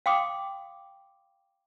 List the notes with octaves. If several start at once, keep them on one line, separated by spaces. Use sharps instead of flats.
F5 G5 C6 D6 D#6